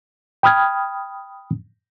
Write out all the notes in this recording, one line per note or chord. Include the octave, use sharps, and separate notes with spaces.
G5 B5 D#6 F6 G#6